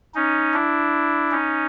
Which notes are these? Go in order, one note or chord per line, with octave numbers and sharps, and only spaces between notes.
C#4 D#4
D4 E4
C#4 D#4